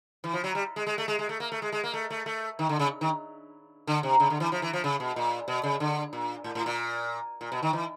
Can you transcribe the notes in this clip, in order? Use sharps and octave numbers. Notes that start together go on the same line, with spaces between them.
E3
F3
F#3
G3
G#3
G#3
A3
G#3
G#3
A3
A#3
A3
G#3
G#3
A#3
A3
A3
A3
D#3
D3
C#3
D#3
D3
C3
C#3
D3
E3
F3
E3
F3
C#3
B2
A#2
B2
C#3
D3
A#2
A2
A2
A#2
A#2
B2
D#3
E3